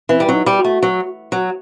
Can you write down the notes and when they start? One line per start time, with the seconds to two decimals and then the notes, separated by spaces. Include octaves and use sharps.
0.09 E3 C4
0.20 G3
0.27 F#3 C4
0.34 D#4
0.46 G3
0.58 F#4
0.65 A3
0.83 F#3
1.32 F#3